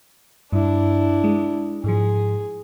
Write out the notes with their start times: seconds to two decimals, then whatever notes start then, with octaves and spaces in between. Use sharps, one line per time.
0.52 G2 D4 E4
1.24 G#3
1.84 G#2 F3 G#4